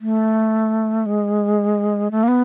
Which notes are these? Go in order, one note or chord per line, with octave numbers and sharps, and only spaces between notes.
A3
G#3
A3
A#3
B3